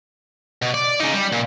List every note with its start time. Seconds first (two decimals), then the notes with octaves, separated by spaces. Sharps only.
0.62 B2
0.74 D5
1.00 C#3 D#4
1.13 G3
1.32 A#2